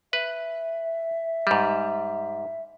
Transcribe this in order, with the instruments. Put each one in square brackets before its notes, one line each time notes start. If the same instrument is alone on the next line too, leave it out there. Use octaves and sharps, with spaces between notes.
[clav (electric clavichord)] B4 [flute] E5
[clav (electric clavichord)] G#2 G3